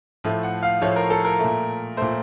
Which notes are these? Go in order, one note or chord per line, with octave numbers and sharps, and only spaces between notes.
A2 F3 A3
F#5
F5
A2 F3 A3 C#5
A#4
A4
A#4
A#2 A3
A#2 A3 C5